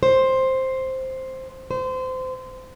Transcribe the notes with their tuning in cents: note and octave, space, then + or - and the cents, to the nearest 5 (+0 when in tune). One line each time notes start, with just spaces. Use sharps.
C5 +5
C5 -25